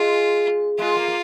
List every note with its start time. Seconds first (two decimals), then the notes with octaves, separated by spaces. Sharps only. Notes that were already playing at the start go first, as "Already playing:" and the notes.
Already playing: G#3 F4
0.79 G#3 F4
0.97 A#3
1.08 A#3